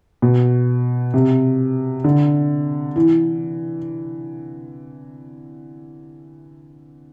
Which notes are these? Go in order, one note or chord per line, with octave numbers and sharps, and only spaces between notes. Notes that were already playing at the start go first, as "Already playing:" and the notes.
B2
C3
D3
E3